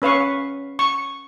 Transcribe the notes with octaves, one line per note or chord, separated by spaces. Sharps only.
C#4 B4 F5 C#6
C#6